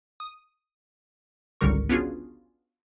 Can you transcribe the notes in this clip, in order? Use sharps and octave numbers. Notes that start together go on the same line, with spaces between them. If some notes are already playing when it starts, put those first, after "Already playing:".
D#6
G#1 C#2 D3 G3 A#4 C#6
B3 C#4 D4 F4 F#4 G#4